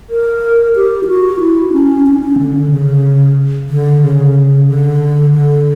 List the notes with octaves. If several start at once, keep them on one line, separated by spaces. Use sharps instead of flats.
A#4
G4
E4
F#4
E4
C#4
C#4
D4
C#4
D3
C#3
D3
C#3
D3
D3